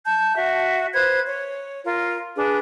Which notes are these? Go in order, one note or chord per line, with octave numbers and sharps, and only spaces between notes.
A5 G6
F#4 E5
B4 C5 F#6 G#6
C#5
F4 A#4
D4 G#4 B4